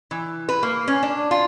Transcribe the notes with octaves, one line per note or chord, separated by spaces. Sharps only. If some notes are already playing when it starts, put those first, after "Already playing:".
E3
B4
A#3
C#4
D4
F4